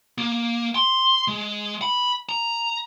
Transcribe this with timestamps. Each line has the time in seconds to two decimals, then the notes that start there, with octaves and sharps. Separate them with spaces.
0.18 A#3
0.76 C6
1.28 G#3
1.82 B5
2.29 A#5